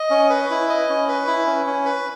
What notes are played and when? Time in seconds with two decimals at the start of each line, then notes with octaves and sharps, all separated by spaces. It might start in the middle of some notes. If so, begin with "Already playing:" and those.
Already playing: D#5
0.10 C#4
0.30 B4
0.50 E4
0.69 D#5
0.89 C#4
1.08 B4
1.27 E4
1.46 C#4
1.66 C#4
1.85 B4